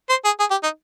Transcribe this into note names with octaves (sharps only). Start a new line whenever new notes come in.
C5
G#4
G#4
G4
D#4